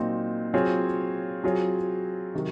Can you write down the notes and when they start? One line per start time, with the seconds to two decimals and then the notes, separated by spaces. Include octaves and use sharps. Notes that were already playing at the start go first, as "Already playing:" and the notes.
Already playing: A#2 F#3 C4 D#4
0.54 F#3 C4 F4 G#4 C#5
1.44 F#3 C4 F4 G#4 C#5
2.35 C3 D#3 F#3